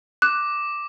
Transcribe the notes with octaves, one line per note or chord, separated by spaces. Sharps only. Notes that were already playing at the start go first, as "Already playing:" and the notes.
D6 F#6